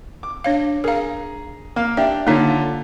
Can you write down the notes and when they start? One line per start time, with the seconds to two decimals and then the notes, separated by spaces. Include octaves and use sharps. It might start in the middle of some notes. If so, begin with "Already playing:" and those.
0.23 D6
0.44 D4 C#5 F5
0.84 G#4 A#4 F5 A#5
1.76 A#3 F5
1.97 D4 G4 E5
2.27 D3 A#3 D#4 F4 C#5